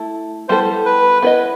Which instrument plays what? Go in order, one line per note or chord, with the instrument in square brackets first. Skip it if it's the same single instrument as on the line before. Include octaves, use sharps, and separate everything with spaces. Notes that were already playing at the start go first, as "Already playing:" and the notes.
Already playing: [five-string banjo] A3 E4 A4
[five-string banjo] G3 B3 E4 A4 [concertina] C5
[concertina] B4
[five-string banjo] B3 E4 B4 D#5